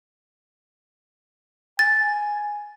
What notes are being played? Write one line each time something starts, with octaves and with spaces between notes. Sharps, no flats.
G#5 A6